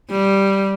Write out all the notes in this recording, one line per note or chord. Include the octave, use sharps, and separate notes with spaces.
G3